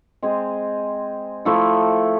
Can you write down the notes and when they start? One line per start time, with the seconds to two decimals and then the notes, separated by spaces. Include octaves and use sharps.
0.22 G#3 C4 G#4
1.45 F3 A3 E4 A4